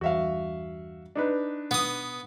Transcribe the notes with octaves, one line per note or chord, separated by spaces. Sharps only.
E2 G2 F#4 E5 F5
D4 D#4 B4
B2 B3 D#6